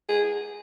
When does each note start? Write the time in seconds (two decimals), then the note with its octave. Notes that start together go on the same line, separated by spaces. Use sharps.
0.09 G#4